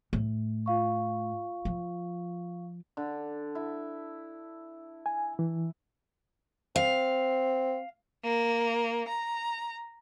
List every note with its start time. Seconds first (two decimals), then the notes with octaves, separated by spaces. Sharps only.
0.13 A2
0.66 F4 F5 C#6
1.65 F3
2.97 D3
3.55 E4
5.06 G#5
5.39 E3
6.76 C4 F5
8.24 A#3
9.08 A#5